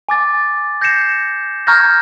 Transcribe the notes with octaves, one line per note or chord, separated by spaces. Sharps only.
G#5 D6 A6
G6 A#6 C7 C#7 E7
A#5 C#6 F6 G6 G#6 A#6